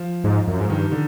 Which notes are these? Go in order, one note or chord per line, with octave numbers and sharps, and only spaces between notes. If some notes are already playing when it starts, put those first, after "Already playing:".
Already playing: F3
G#2
F#2
G#2
G2 D#3
D3